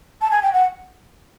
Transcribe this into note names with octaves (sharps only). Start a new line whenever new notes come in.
A5
G#5
G5
F#5